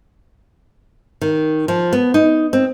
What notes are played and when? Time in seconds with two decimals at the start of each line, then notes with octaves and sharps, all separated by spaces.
1.21 D#3
1.68 F3
1.93 B3
2.14 D#4
2.53 C4